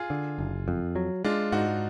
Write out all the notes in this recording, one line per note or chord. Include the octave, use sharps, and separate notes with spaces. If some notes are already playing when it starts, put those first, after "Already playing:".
Already playing: F4 G#4
D3
F#1
F2
F#3
G#3 D4 F4
G#2 D#4 F#4